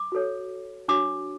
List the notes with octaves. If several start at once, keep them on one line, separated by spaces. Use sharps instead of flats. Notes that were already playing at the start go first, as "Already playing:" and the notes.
Already playing: D6
F#4 A4 C#5
D4 F#4 C#5 D6